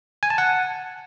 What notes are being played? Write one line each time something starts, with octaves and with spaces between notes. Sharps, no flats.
G#5
A5
F#5